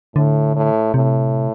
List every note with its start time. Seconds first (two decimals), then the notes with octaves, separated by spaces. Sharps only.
0.16 A2 D3
0.56 A2
0.94 A2 C3